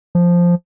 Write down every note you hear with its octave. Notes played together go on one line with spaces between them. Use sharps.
F3